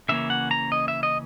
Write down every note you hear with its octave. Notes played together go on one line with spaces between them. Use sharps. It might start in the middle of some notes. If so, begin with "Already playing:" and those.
C#3 E3 A#3 C#4 E5
F#5
A#5
D#5
E5
D#5